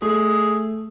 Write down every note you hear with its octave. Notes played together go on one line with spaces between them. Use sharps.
A3 G#4